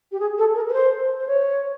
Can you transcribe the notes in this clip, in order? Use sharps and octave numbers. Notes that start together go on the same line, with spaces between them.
G4
G#4
A4
A#4
B4
C5
C5
C#5